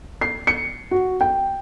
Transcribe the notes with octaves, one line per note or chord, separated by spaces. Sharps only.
C7
C#7
F#4
G5